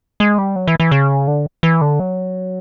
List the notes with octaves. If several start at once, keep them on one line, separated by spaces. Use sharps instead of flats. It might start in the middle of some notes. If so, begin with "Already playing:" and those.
G#3
G3
F#3
E3
E3
C#3
D3
E3
D3
F#3